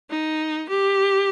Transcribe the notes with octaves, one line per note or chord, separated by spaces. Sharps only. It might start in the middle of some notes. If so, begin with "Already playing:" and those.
D#4
G4